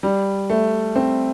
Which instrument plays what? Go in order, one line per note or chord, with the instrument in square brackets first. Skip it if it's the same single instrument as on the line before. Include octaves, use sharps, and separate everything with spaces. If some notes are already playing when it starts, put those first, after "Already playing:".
[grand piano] G3
A3
C4